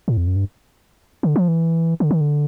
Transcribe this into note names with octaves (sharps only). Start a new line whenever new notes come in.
A2
F2
F#2
G2
D3
F3
E3
D3
D#3
D3